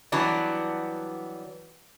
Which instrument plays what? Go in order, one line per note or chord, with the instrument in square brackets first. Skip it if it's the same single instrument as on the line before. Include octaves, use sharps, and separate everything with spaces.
[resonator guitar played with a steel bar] E3 F#3 G3 B3 D4